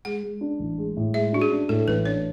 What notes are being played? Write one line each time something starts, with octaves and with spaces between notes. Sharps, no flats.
G#3 F#5
G#3
D4
A1
G#3
A2
G#3 E5
D4 F#4
G#4
D4
A2 A4
A1 B4
D4 C#5